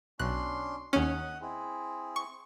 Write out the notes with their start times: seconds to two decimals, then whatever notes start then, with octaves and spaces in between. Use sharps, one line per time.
0.19 B1 C#4 D4 C6 F#6
0.93 D#2 C#4 D#5 F#5 D#6
1.41 C4 E4 G#4
2.16 C#6